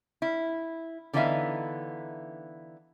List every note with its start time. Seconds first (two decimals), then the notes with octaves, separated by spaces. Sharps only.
0.22 E4
1.13 D3 E3 B3 D#4 E5 F5